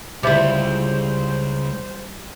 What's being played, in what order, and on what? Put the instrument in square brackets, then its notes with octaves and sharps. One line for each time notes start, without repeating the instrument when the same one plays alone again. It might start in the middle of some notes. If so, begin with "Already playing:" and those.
[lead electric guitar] C#2 [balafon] D3 E5 D6 [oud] G3 E4 [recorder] C5